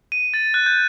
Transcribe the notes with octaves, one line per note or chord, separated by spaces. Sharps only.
D#7
A6
F#6
G6